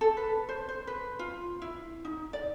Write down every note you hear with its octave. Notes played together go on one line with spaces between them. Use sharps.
A4
B4
C5
C5
B4
F4
E4
D#4
D5